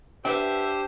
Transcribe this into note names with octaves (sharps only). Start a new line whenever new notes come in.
D4 G4 B4 C5 E5 F#5 G5